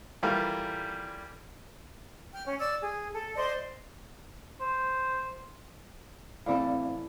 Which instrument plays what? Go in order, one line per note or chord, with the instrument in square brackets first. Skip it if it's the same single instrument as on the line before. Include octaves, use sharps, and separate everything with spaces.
[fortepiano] E3 G3 A3 A#3 F4
[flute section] G5 F6
C#4
D5 E6
G#4
A4
C5 D5 D#5 C6
[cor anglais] C5
[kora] A2 E3 A4 [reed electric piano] C4 D5 F5